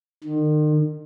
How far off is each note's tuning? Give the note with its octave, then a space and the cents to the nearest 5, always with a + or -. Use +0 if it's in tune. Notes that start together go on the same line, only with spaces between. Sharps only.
D#3 -40